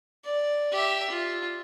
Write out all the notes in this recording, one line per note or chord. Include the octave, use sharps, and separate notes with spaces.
D5
G4 E5
F4